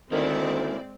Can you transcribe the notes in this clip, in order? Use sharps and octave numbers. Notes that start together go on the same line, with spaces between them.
D2 D#3 G#3 A#3 C4 C#4 E4 D5